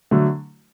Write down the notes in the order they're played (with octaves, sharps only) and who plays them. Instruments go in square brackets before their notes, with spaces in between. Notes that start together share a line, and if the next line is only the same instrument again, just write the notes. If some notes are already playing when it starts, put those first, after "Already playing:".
[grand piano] D3 F#3 A3